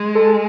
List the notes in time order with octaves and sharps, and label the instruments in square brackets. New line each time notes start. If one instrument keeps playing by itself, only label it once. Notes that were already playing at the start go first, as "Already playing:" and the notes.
Already playing: [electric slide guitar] G#3
[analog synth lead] A4